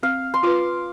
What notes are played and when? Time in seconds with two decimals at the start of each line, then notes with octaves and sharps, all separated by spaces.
0.03 C4 F5
0.34 C6
0.43 F4 B4 D6